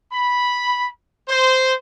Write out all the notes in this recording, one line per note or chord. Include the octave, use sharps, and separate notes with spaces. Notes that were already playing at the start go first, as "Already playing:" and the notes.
B5
C5